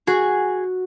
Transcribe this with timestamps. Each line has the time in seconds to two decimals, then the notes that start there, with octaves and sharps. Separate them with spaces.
0.07 F#4 G#4